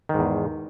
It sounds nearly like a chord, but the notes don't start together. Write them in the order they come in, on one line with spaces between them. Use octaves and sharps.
D#3 G#2 E2